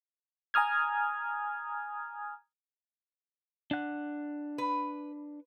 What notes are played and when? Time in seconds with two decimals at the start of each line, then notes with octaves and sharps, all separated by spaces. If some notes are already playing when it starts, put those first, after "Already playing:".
0.54 G#5 A#5 D#6 F6 G#6
3.71 D4 F#5
4.58 B4